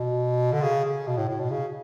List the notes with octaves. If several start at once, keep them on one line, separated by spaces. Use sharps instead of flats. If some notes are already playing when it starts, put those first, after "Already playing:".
Already playing: B2
D3
C#3
C#3
B2
A2
A2
B2
C#3